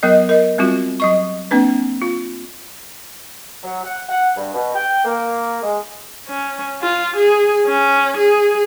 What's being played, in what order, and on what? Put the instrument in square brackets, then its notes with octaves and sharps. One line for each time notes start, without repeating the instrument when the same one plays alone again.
[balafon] F#3 B3 A#4 D#5
A#4 D#5
G3 C4 F4 F#4
F#3 D#5 C#6
A#3 C4 D4 B4
F4
[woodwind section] F#3
F#5
F#5
G2
B2
G5
A#3
G#3
[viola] C#4
F4
G#4
C#4
G#4